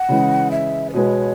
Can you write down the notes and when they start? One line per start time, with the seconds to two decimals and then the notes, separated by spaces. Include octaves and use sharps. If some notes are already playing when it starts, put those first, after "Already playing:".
Already playing: F#5
0.09 C#3 E3 G#3
0.51 E5
0.90 B4
0.93 B2 G#3 B3 C#5